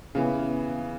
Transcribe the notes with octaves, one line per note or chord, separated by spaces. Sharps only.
C#3 E3 B3